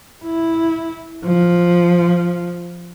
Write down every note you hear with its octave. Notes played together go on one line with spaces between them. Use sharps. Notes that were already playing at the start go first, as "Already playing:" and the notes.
E4
F3